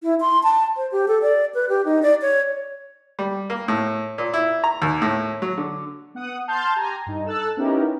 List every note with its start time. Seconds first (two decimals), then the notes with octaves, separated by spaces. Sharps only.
0.03 E4
0.21 C6
0.43 A5
0.77 C5
0.92 G4
1.08 A4
1.22 D5
1.55 B4
1.69 G4
1.85 D#4
2.03 D5
2.22 C#5
3.19 G3
3.50 A#3
3.68 A2
4.18 A#2
4.34 E4
4.64 A#5
4.82 D#2
5.02 A2
5.42 F#3
5.58 D3
6.15 B3 F#5 D#6
6.48 A5 C6 F6 G6 A6
6.76 G4 G#5 A#5
7.06 G2 D#4
7.26 A4 E6 F#6 A6
7.57 B3 C#4 D#4 E4 G4 A#4